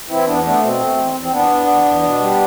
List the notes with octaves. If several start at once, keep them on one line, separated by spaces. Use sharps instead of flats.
E3 C4 E4
E2 B3 D4
A3 B3 D4
B2 C4
A3
E2
E2
C4
E2 B3 D4
E2
E2
E2
B2
G3